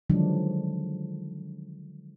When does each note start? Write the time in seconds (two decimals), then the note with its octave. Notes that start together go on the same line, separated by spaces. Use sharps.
0.10 D3 D#3 F3 F#3 G#3 D4